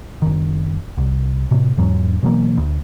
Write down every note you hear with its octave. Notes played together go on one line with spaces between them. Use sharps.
F#1 D#3
C2
A2 C3
E2 G#2 F#3
B2 E3 F#3 A#3
D2